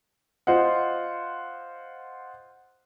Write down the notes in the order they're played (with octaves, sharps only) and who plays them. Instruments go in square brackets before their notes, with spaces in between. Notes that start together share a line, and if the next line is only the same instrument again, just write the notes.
[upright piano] F4 C5 D#5 F#5